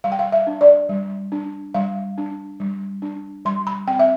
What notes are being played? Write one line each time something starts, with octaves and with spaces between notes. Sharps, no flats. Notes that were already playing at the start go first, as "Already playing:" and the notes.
G3 F5
G5
F5
E5
D4
D5
G3
D4
G3 F5
D4
G3
D4
G3 C6
B5
C4 G5
E5